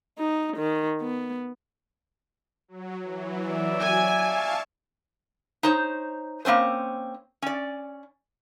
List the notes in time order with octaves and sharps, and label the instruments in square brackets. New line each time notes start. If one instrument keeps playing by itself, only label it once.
[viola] D#4
D#3
B3
[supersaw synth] F#3
E3 F#3
[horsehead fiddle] D5 E5
[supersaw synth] F#3 [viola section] G#5
[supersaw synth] F5 A5 C#6
[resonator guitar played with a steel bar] D#4 C5 C#5
A#3 C4 C#4 C5
C#4 D5